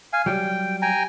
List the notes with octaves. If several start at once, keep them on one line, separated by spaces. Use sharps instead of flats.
F5 G#5
F#3 G3 G5
G5 G#5 A#5